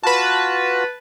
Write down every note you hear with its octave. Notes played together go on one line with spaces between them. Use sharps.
F4 F#4 B4 A5